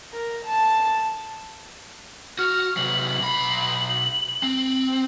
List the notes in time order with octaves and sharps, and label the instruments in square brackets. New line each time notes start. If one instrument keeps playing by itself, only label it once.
[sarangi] A#4
A5
[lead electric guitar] F#4 [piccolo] F6
[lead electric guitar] C3 F#3 [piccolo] F#7
[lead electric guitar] B1 B5
C4